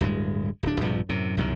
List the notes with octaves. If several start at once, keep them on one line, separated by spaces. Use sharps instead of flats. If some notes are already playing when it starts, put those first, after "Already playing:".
D1 G2 G#3
D1 D4
A#1 G2 C3 F3
F#2 A2 C3
C2 F#2 B2 D#3